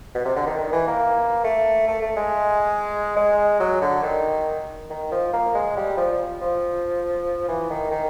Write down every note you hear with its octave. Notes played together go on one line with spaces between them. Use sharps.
B2
C3
D3
D#3
D#3
E3
A#3
A3
A3
A3
G#3
G#3
F#3
D3
D#3
D#3
F3
A#3
G#3
G3
F3
F3
E3
D#3
D#3